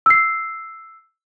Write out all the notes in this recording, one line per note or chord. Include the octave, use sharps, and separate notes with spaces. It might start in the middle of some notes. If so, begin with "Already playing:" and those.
E6 C7